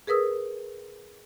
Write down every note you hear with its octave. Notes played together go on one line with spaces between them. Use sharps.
G#4 A#4 B4 D#6 E6